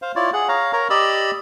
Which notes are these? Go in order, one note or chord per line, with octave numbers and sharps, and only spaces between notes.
C5 F5
E4 F4 C#5 D5
G#4 F#5
C#5 F5 A#5
A#4 C#5 A#5
G4 D5 D#5 B5 E6